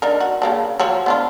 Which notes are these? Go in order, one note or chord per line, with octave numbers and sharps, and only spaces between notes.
D4 D#4 A#4
F#4
C#3 A#3 D4
F3 F#3 C#5
B3 D4 F4